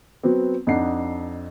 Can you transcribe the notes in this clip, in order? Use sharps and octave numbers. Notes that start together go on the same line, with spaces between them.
F#3 B3 C4
F2 D4 D#4 F#5 C7